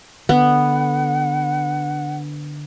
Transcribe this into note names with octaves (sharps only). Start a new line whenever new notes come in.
D3 B3 F#5